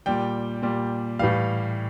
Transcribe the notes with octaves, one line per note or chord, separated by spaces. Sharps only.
A#2 G3 G5
A#2 G3
A2 E3 G3 F5